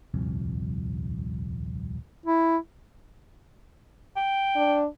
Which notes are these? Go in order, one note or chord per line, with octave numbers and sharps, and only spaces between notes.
D#1 C2 F2
E4
G5
D4